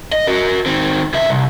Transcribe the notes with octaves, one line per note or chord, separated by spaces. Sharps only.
D#5
F#4 A#4
D#3 C4
C#2 E5
C2